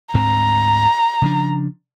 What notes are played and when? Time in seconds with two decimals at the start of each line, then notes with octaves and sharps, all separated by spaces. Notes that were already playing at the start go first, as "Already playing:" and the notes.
0.14 D2 G#2 C4 A#5
1.22 C#3 F3 D4